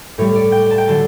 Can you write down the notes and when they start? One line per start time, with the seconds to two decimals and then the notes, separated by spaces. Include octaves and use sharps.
0.18 A2 G3 C#5
0.36 D5
0.52 G5
0.70 A5
0.78 G5
0.88 D3 F#3 A5